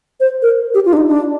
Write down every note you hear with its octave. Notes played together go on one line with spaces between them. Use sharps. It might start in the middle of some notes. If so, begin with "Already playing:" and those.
C5
A#4
G4
F4
D4
D#4
D4